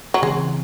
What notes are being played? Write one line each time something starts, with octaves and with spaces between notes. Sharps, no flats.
F#3
C#3 E3 G#3 C4